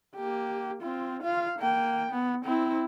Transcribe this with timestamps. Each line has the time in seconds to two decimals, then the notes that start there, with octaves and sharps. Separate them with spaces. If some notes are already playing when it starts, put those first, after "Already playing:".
0.15 A#3 G4
0.82 C4 F4
1.23 F4 F5
1.59 A#3 G5
2.12 B3
2.45 C4 E4